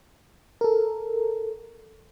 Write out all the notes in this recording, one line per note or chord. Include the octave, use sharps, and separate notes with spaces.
A4 A#4